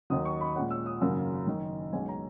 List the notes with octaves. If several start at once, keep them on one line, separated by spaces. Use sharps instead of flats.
D#2 D#3 F#3 D#6
C#6
B5
A#2 G#3 C#4 F#5
E6
D#6
G#1 F#2 C#3 F#3 A#3 E6
F#1 F#2 D#3
B1 B2 G#3 C#4 G#5
A#5